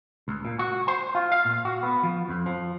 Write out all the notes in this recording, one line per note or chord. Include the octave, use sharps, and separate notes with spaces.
C#2
A#2
F#4
C5
F4
F5
A#2
F#4
B3
F3
F2
F3